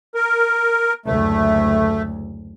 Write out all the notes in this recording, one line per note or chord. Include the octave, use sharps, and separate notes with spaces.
A#4
F#1 D2 A3